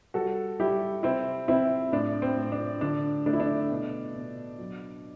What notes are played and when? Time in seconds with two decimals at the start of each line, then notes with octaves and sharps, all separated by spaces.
0.14 G3 F#4 A4
0.60 G3 E4 G4
1.03 C3 C4 E4
1.48 C3 C4 E4
1.92 A2 D4
2.22 C4
2.37 A2
2.52 D4
2.81 D3 D4
3.26 A3 D4
3.33 E4
3.40 D4
3.70 B2
4.15 B2
4.59 F#3